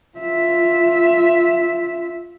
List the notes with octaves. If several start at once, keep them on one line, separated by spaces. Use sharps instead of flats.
F4 E5